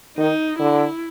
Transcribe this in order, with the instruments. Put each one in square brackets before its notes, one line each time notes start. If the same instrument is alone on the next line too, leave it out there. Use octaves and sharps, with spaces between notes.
[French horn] D#3 [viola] D#4
[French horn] D3 [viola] E4